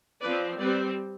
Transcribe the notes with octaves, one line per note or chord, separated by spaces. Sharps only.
F3 C4 B4 D5
G3 C4 B4 D5